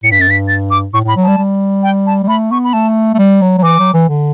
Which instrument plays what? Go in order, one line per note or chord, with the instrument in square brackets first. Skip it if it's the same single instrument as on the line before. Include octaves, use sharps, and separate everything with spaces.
[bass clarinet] A2 [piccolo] C#7
[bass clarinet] G2 [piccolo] B6
[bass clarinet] F#2 [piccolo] A6
[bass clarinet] G2 [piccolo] B6
[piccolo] A6
D6
[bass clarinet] A2 [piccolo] C#6
[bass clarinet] A2 [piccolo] B5
[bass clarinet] F#3
[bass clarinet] G3 [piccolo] A5
[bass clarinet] G3
[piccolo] G5
A5
[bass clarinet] G3
[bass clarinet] A3 [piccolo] B5
[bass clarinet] B3 [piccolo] C#6
[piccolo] B5
[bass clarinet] A3 [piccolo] A5
[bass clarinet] A3
G3
F#3
F#3
[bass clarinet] E3 [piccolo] D6
[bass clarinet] F#3
E3
D3